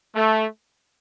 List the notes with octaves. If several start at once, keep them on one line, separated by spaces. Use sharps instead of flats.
A3